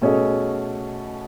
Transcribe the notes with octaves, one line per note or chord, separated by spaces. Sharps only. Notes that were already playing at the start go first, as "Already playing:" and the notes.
B2 A3 C#4 G#4 D#5